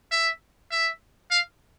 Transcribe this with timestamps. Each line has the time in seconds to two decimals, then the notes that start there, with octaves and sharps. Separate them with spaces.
0.11 E5
0.71 E5
1.31 F5